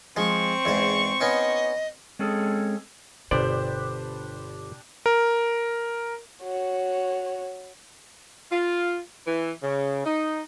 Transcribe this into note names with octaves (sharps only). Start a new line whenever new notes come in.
F3 G#3 C4 C#6
E2 G#2 C5
B3 C#4 D#4 D#5
G#3 C4 C#4 G#4 A4
G1 B2 D4 G4 C5 D5 B5
A#4
F#4 C#5
F4
E3
C#3
D#4